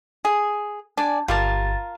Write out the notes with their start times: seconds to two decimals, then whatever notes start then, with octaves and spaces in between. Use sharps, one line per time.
0.25 G#4
0.97 D4 D5 G#5
1.28 G1 G3 F4 A#4 A5 A6